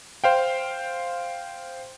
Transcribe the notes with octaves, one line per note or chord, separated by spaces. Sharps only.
C5 F5 G5